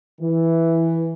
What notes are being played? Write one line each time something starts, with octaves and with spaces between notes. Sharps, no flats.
E3